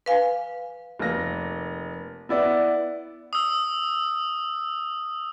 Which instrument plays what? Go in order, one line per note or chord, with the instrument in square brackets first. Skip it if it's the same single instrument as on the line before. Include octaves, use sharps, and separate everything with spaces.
[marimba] B4 F5 G#5
[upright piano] F1 A#3 A#6
B3 E4 D5
[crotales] D#6 E6